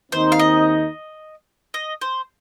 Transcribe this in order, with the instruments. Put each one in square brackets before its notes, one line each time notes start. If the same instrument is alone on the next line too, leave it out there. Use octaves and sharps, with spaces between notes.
[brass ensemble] D#2 D#3 C4 D#4 [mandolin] C5
[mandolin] F5
D#5
D#5
C5